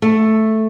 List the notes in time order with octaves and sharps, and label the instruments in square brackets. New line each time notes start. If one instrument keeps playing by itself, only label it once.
[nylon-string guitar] A3